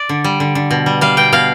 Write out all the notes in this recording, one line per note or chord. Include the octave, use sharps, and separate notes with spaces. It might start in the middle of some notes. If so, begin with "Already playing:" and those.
Already playing: D5
D3
G3
D3
D3
B2
G3
G3 F5
B2 G5
B2 F5